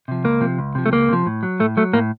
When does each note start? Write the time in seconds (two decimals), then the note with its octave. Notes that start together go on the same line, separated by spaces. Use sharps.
0.08 C3 F3
0.24 C#2 A#3
0.41 C3 F3
0.59 C#2
0.75 C3 F3
0.86 A3
0.92 C#2 A#3
1.09 C3 F3
1.26 A2
1.43 F#3
1.60 A2 A3
1.77 F#3 A3
1.93 A2 A#3